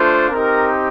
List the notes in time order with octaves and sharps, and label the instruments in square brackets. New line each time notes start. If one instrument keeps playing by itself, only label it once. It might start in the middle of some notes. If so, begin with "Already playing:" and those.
Already playing: [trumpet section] A3 D4 F4 C5
C4 D#4 G4 A#4